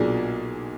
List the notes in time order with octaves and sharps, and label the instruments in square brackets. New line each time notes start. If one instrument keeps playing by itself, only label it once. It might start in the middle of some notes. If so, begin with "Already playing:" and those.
Already playing: [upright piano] B1 A#2 F#3 D4 G#4